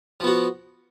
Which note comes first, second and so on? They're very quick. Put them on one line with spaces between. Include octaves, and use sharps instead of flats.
F3 B3 F#4